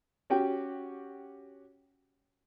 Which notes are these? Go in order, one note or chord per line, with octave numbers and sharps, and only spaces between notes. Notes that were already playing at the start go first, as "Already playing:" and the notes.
C#4 F#4 G4 G5